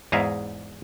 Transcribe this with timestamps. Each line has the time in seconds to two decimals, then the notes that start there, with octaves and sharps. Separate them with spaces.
0.12 E2 G#2 D#4 G#4 E5 F5